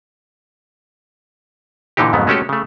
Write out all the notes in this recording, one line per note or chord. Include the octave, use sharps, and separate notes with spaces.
A#2 D3 E3 D#4 G4
F2 G#2 C#3 F#3 A3 B3
G#3 A3 C#4 F#4 G4 A4
C#3 A3